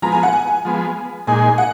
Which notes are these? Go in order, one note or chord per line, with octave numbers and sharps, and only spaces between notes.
F3 G#3 B3 A#5
G#5
F#5
G#5
F3 G#3 B3
A#2 G#3 D#4 G#4 G#5
F#5